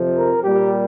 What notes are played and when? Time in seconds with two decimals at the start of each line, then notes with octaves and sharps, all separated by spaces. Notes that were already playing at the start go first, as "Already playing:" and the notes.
Already playing: F2 C3 F3
0.15 A#4
0.43 A#2 G3 A#3 G4